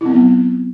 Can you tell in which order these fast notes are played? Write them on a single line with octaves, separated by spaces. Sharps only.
E4 C4 B3 F#3